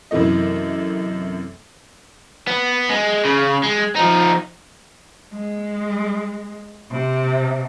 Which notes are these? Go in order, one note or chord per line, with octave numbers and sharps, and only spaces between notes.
F#2 C3 E3 A3 D#5
B3
G#3
C#3
G#3
F3 D#4
G#3
C3